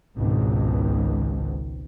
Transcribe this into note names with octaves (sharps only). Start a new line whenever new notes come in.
G#1 C#2 B2